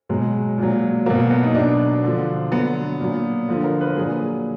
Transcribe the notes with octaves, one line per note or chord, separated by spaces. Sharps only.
B2 F#3 G#3
A#2 F#3
B2 F#3 A#3
B3
D#4
B2 F#3 D4
D3 F3
D3 F#3 B3
A#2 F#3
D3 F3
A#4
B4
A#4
A#2 F#3 G#4